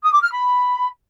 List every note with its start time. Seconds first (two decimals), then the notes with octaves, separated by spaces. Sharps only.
0.03 D#6
0.12 D6
0.22 F6
0.32 B5